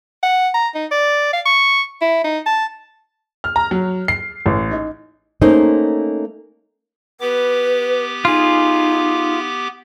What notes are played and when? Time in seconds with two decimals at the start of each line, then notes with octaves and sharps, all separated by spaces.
0.23 F#5
0.54 A#5
0.75 D#4
0.91 D5
1.33 F5
1.46 C#6
2.01 E4
2.24 D#4
2.46 A5
3.44 F6
3.56 A#5
3.71 F#3
4.08 C7
4.46 A1
4.71 D#4
5.42 A3 A#3 C#4 D#4 C5
7.21 B3 G4 B4 D6
8.25 D#4 F4 G#4